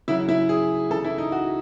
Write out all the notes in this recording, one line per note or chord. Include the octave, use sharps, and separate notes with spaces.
C#3 F#3 E4
E4
G#4
C#3 E3 A4
E4
D#4
F#4